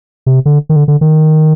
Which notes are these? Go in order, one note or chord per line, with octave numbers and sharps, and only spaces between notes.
C3
D3
D#3
D3
D3
D#3